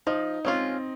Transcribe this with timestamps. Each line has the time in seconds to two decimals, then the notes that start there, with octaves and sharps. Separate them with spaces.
0.07 F3 D#4
0.45 G#3 C4 C#4 F4